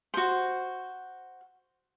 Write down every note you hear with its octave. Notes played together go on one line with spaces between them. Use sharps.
F#4 C5